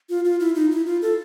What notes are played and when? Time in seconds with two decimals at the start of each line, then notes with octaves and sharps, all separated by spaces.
0.10 F4
0.25 F4
0.40 E4
0.55 D#4
0.71 E4
0.86 F4
1.02 A4